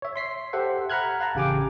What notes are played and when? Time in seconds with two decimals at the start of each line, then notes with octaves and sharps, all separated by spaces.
0.02 C#5 E5
0.16 C6 B6 C7
0.53 G4 A4 C5 E5 F#5
0.90 F#5 A#5 B5 F6 F#6 G#6
1.20 F5 A5 A#5
1.35 A1 C#3 G4 G5 G#5 D6